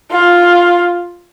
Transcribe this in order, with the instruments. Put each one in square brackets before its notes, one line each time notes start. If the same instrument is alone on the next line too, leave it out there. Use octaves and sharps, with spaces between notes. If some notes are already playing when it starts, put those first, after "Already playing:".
[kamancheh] F4